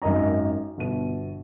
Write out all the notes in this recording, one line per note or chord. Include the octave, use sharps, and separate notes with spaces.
G#1 F#2 A#4 D#5 A#5
G1 B2 D#7